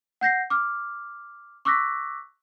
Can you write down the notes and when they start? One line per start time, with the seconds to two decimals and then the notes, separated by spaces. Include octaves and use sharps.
0.21 F#5 G6 A#6 C7
0.50 D6 F6
1.65 C#6 D6 E6 F#6 A#6 B6